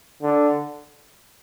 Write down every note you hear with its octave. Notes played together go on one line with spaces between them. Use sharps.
D3